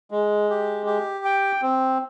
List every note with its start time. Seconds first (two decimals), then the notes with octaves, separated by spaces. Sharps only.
0.11 G#3
0.50 G4
0.86 G4
1.25 G5
1.62 C4